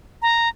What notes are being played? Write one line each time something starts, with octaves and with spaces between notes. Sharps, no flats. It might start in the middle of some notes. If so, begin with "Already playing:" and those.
A#5